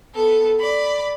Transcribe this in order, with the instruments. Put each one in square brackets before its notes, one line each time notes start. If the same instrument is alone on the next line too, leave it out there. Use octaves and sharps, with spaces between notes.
[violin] B3 A4
D5 B5